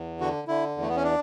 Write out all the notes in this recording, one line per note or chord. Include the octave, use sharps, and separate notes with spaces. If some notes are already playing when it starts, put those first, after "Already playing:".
Already playing: E2
D3 F#4
D3 E4
E2
A3
B3
C#4
D4